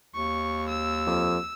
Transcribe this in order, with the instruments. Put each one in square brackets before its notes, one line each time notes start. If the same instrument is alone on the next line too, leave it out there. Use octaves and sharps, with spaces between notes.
[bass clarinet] D#2 [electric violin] C#6
[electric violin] E6
[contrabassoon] F2